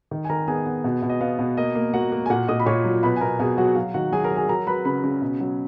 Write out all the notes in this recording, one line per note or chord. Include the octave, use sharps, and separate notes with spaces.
D#3
G#5
D#3 A#4 A#5
B3 G#4 G#5
B3
B2
B2
D#5
B3 F5
B2
A#3 D#5
A#3
A#3 F#4 F#5
A#3
G#5
A#2 F#4 F#5
A#2 D#5 D#6
B5
A#2 C#5 C#6
F#3
B2 B4 B5
G#5
B2 A#4 A#5
B2 G#4 G#5
F#3 F#4 F#5
F#3 F5
D#3 F#4 F#5
F#3 G#4 G#5
A#4 A#5
F#3
G#4 G#5
F#3 A#4 A#5
F#3 B4 B5
C#3 B4 B5
C#3
B2
F#3